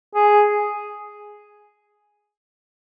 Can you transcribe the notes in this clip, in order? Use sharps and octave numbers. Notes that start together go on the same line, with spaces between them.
G#4